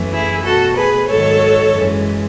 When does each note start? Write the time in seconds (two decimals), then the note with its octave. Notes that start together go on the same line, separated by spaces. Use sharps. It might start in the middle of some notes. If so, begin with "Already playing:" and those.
Already playing: F#2 E3 A3
0.11 E4 G#4
0.43 B2 A3 F#4 A4
0.75 G#4 B4
1.08 G#2 D#3 F#3 A4 C#5
1.73 F#2 E3 G#3